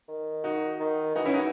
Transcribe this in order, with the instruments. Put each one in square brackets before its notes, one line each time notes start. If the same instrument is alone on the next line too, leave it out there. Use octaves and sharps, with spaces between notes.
[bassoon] D#3
[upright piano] D#4 F#4
[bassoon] D#3
[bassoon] E3 [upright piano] D#4 F#4
[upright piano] C#4 E4
D#4 F#4